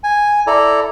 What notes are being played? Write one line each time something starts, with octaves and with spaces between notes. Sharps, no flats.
G#5
E4 A4 D5 A#5